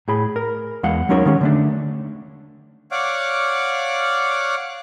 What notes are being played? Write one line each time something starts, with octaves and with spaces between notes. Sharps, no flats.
A2 G#4 B5
A#4
E2 G#3 F5 F#5
F#3 G#3 C#4 D#4 A#4 C#5
D#3 G#3 C#4 G4
D3 A3 D4
C#5 D5 F5 F#5 D6